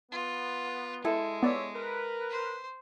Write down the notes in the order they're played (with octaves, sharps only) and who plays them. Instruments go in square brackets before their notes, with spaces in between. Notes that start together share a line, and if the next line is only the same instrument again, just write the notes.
[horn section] B3 [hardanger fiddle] F4
[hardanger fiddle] G#3 [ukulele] E4 A4
[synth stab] B3 D5 [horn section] F4 C#5 E5
[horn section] A#4 B4
[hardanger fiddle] C5